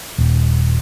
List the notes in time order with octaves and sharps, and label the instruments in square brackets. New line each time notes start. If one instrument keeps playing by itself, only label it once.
[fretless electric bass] D#1